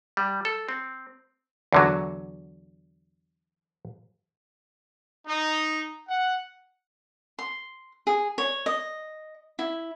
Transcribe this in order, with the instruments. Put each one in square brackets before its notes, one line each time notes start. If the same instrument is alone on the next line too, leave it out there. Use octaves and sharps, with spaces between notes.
[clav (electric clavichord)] G3
A4
C4
E2 D3 F#3
[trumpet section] D#4
F#5
[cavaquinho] C6
G#4
C#5
D#5
E4